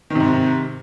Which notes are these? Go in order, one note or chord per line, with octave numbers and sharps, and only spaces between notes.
G#2 C3 D#3